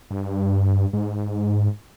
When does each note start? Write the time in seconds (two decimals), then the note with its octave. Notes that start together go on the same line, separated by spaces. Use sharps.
0.11 G2
0.93 G#2